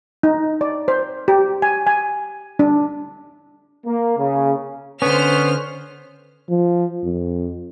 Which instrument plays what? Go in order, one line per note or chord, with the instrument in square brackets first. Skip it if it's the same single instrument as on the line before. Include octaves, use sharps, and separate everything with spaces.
[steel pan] D#4
D5
C5
G4
G#5
G#5
D4
[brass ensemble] A#3
C#3
[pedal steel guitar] D3 C#4 [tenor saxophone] B3 [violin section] C5 F6
[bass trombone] F3
F2